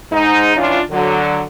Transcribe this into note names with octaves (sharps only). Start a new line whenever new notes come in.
G#2 D#4
E3 C#4 D4 F4
D3 F#3